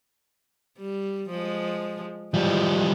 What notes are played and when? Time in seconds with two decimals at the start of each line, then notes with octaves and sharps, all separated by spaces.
0.78 G3
1.29 F3 G#3
2.34 E3 F3 G3 G#3